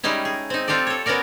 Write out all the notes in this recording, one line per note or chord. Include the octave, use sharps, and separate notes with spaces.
G3 G#3 C#4 D#4 E4
G#4
C4 D#4
C4 F4 G4 A4 D5
A4 C#5
B3 C#4 F#4 A#4 D5